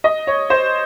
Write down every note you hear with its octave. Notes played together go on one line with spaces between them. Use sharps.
D#5
C#5
C5